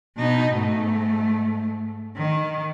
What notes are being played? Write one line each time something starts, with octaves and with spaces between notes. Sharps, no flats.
B2 D#4
G#2 A3
D#3